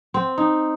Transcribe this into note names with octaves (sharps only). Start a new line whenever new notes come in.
C4
D#4